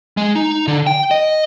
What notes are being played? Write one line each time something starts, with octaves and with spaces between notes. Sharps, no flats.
G#3
D#4
D3
G5
D#5